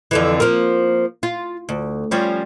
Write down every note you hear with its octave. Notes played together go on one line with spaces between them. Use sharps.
F2 D3 E3
F3 A#3
F4
D2
F3 G3 C#4